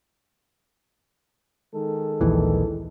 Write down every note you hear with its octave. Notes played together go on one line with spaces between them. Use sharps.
D#3 G#3 A4
A#1 D#2 E3